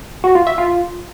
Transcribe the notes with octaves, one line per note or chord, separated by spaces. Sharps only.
F#4
F4
E5
F4